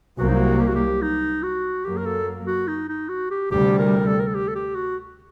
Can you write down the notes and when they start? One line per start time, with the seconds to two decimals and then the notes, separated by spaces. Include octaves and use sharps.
0.19 C2 C3 F#3 A#3 F#4
0.28 D#4
0.36 F#4
0.60 G4
0.68 F#4
0.76 G4
1.02 D#4
1.43 F#4
1.85 F#2 F#3 A#3 G4
1.97 A#4
2.06 A4
2.47 F#4
2.68 D#4
2.89 D#4
3.09 F#4
3.31 G4
3.51 D2 C3 G3 G4
3.79 A#4
4.07 A4
4.20 A#4
4.27 A4
4.35 G4
4.48 A4
4.56 G4
4.75 F#4